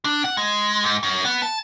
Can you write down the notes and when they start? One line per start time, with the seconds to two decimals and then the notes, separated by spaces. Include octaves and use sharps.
0.05 D4
0.24 F#5
0.37 G#3
0.83 G#2
1.03 F#2
1.25 B3
1.42 A5